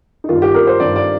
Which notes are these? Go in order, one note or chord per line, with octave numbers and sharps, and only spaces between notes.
D#4
G2 D#3 F4
G4
A#4
C5
G2 D#3 D5
D5